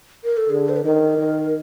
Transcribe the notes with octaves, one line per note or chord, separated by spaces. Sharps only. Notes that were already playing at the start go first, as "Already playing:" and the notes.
A#4
A4
D3 G#4
C5
B4
D#3 A#4
D#3